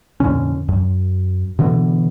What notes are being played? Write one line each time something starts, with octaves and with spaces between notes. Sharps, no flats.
F2 A#2 D3 C#4
F#2
B2 D3 E3 B3